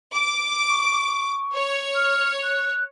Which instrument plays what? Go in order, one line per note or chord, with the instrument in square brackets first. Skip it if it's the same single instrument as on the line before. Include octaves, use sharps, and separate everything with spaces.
[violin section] D6
[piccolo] C#6
[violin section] C#5
[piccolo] F6
F#6